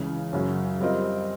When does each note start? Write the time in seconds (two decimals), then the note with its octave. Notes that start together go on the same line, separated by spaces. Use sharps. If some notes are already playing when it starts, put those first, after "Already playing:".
Already playing: C#2 C#3 E3
0.33 F#2 C#3 F#3
0.80 G3 C4 F4 A#4 D#5